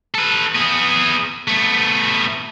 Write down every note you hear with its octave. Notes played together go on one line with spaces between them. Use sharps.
A4 B4
B3 G#4
A3 B3